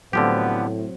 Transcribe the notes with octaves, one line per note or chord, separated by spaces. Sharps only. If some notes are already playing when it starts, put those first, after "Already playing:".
A2 D3 F3 F#3 B3 C4 G4